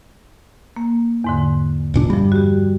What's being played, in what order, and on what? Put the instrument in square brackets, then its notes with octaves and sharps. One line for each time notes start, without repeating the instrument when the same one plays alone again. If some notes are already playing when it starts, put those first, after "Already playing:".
[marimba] A#3
E2 G#2 D3
[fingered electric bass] E1 A#2 D4
[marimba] G2 F3 [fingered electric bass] G3
[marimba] F#4 G4